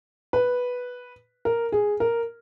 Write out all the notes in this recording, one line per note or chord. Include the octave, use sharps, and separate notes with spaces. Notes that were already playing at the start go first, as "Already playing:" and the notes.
B4
A#4
G#4
A#4